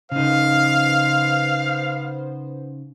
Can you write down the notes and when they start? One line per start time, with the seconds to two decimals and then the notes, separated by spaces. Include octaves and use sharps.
0.12 C#3 B3 D#4 C5 F5